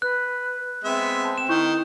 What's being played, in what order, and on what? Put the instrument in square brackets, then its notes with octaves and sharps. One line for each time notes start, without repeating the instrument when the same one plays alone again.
[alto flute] B4 [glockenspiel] F#6
[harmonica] G#3 B3 E5 [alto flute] C4
[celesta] A5
[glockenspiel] E7
[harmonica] D#3 [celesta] E4 C#6 G6